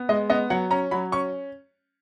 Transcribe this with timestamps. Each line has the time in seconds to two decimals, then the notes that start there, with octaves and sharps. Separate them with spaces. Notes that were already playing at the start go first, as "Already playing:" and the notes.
Already playing: B3
0.09 G#3 D#5
0.30 B3 D#5
0.50 F#3 F#5
0.70 C#4 A#5
0.91 F#3 B5
1.12 C#4 C#6